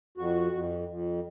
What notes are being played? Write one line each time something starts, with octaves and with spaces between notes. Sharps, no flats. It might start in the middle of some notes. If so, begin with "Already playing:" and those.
F2 F#4
F2
F2